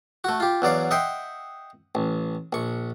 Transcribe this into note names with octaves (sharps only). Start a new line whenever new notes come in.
A3 F#4
F4 G4
E2 F#3 D5 F5
D#5 E5 F#5 G5 C6
A1
A#1 C#6